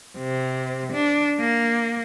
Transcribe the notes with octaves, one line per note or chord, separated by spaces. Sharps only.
C3
D4
A#3